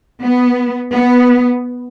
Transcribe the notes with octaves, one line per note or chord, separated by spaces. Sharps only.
B3
B3